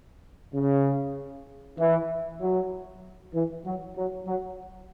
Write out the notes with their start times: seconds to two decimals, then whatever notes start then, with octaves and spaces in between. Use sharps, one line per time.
0.54 C#3
1.79 E3
2.41 F#3
3.34 E3
3.65 F#3
3.96 F#3
4.27 F#3